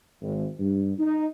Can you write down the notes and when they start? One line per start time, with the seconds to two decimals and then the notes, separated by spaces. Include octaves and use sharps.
0.21 G#1
0.59 G2
0.99 D#4